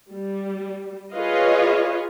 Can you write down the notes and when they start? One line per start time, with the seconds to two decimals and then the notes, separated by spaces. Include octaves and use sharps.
0.12 G3
1.13 F4 G#4 B4 C#5 D#5 F5